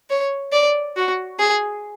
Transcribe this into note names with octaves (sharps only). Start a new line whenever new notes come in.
C#5
D5
F#4
G#4